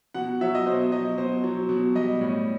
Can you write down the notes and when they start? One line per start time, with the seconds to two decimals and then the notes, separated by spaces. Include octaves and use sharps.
0.14 B2 F#5
0.41 F#3 E5
0.55 D#5
0.66 B2 C5
0.92 F#3 D#5
1.18 B2 C5
1.44 F#3
1.69 B2
1.95 G3 D#5
2.21 A2